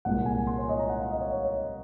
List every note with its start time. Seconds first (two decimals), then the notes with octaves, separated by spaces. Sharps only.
0.05 C2 A#2 G#3 F#5
0.26 G#5
0.47 C6
0.58 C#5
0.69 D#5
0.79 A#5
0.89 F#5
1.00 F5
1.11 D#5
1.21 C#5
1.32 C#5